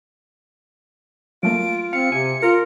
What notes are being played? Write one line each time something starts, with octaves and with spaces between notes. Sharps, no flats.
F#3 A3 A#3 F4 D7
C4 F5 C#7
C3 G#5
F4 A#4